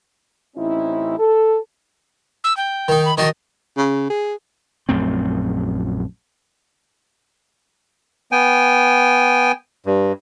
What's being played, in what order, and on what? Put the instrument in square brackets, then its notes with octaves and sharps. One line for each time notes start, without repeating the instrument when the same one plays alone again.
[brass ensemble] A1 C4 C#4 D#4 E4
A4
[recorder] E6
G5
[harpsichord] D#3 D#4
[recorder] B5
[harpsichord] D#3 D4 F#4 [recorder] D#5
[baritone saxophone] C#3
G#4
[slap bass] A#1 F#2 A3 C4
[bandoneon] B3 G5 G#5
G2